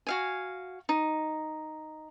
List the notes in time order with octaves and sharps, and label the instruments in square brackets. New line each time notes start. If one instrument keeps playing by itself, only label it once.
[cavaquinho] F#4 F5 G#5
D#4